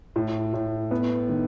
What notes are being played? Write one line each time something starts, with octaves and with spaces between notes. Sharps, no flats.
A2
A2
B3
D#3